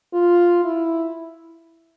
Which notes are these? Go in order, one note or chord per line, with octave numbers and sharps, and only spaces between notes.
F4
E4